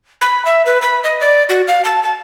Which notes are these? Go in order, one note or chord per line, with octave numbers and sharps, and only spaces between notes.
B5
E5
B4
B5
D#5
D5
F#4
F5
A5
A5